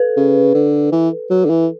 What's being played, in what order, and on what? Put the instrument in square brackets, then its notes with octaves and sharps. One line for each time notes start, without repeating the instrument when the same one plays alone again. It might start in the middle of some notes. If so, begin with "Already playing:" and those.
Already playing: [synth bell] A4 B4
[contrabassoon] C#3
D3
E3
F#3
D3
E3